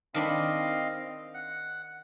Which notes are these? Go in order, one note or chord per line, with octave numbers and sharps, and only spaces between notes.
D#3 C4 D4 D#5 F5 B5
F#5